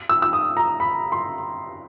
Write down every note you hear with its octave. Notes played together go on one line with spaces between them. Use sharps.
E6
E6
D#6
A#5
B5
C6